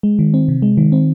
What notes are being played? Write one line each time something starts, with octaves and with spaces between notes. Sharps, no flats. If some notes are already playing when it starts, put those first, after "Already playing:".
G#3
D#3
C4
C3
G#3
D#3
C4